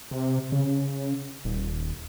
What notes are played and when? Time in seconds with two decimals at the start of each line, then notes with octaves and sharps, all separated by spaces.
0.11 C3
0.52 C#3
1.45 D#1